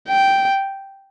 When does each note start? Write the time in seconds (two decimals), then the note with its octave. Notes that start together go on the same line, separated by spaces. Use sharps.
0.09 G5